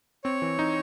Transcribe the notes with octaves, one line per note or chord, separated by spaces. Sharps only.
C4 C#5
E3
D#4